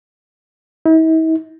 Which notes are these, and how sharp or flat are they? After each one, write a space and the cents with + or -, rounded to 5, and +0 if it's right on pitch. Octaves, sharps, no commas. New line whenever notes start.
E4 -45